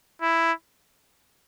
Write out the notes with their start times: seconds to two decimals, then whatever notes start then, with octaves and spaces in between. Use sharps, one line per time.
0.22 E4